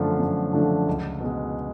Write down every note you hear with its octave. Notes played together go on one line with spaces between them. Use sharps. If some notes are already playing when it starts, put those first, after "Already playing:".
Already playing: F#2 D3 F3 A3 D4
F#2
D3 F3 A3 D4
C#2
B2 G#3